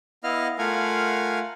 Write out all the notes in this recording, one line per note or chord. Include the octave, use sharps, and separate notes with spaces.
B3 E4 D#5 F5 F6
A3 F4 A#4 F5 F#5 G#5